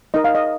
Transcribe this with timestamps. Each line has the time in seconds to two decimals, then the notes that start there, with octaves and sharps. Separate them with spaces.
0.14 D#4 A#4 D#5
0.24 F5
0.35 D#5